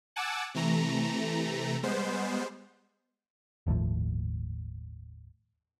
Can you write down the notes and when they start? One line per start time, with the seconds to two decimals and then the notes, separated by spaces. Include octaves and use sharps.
0.16 F#5 G#5 A5 D6 E6
0.54 C3 E3 A3 A#5
1.83 G3 G#3 B3 C5
3.67 G1 D#2 A2 F3